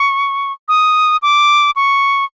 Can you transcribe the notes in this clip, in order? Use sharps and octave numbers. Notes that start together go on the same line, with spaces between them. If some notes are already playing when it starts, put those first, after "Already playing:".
Already playing: C#6
D#6
D6
C#6